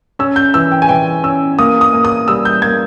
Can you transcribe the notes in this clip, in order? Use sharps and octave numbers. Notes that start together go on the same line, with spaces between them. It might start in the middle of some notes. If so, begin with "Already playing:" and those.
C#4 E6
G6
E3 E6
G5
G#5
E3 G5
C#4 E6
A#3 D#6
D#6
A#3
D#6
G3 E6
G6
A#3 G#6